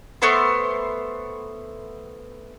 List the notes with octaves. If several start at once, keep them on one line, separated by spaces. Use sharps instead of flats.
A3 B3 C5